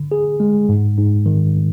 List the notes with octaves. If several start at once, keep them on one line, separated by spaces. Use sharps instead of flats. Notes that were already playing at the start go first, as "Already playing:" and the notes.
Already playing: D3
G#4
G#3
G#2
G#2
D#3